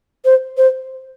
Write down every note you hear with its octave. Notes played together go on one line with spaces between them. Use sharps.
C5
C5